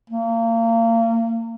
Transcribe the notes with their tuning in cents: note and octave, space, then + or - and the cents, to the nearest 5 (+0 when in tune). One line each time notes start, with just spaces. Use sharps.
A#3 -35